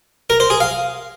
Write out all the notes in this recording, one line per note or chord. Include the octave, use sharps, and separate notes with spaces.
A#4
C5
G#4
F5